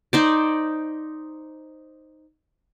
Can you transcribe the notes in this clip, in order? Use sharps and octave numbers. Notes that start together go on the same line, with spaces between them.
D#4 C5 D5